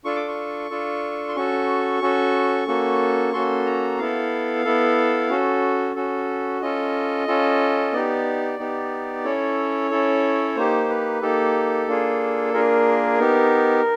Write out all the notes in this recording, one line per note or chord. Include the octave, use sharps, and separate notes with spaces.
D4 F4 A4 C#6
D6
C#6
D4 F4 A4
C6
C#4 F#4 A4 C#6
C#4 F#4 A4
A#3 C#4 F#4 A4
A#3 C#4 F#4 A4 C6
A#5
B3 E4 A4 F5
B3 E4 A4
C#4 F#4 A4
C#4 F#4 A4
C#4 F4 A4 D#5
C#4 F4 A4
B3 D#4 G4 D5
B3 D#4 G4
C#4 E4 A4 C#5
C#4 E4 A4
A#3 D#4 G4 C5
B4
A#3 D#4 G4 A4
A#3 D4 F4 G#4
A#3 D4 F4 G#4 A#4
B3 D#4 G4